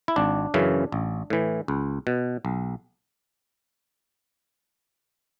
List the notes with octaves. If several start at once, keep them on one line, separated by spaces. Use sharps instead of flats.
E4
G#1 D4
F#2 C#3 E3
A1
A2 E3
C#2
B2
B1